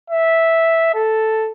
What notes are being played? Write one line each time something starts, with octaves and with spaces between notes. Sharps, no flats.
E5
A4